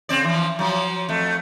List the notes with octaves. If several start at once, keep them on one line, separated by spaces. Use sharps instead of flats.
C#3 C4 D5
E3 F3
F3 F#3
F2 A3